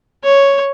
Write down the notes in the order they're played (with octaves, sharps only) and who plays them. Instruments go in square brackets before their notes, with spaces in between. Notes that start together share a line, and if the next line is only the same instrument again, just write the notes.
[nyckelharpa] C#5